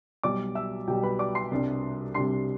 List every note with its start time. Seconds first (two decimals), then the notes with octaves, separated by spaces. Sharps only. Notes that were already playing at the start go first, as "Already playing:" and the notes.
0.23 B1 B2 G3 D5 D6
0.55 E5 E6
0.87 B1 B2 G3 G4 G5
1.03 B4 B5
1.19 D5 D6
1.35 C6 C7
1.51 C2 C3 G3 D4
2.14 C2 C3 G3 D4 C6 C7